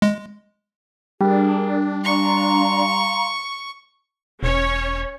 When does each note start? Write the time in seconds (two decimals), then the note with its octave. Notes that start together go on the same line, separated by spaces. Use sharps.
0.02 G#3
1.21 G3 D4 G#4 A#4
2.04 F5 A#5 C6 C#6
4.43 E1 C#4 C#5